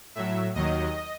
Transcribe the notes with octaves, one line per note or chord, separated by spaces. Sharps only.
A2 F#3 E5
D#2 D#3 F#3 D#5